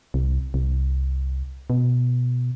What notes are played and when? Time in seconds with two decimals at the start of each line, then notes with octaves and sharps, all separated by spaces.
0.14 C2
0.54 C2
1.70 B2